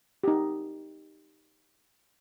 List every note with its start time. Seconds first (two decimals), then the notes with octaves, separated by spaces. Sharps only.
0.24 D#4 G4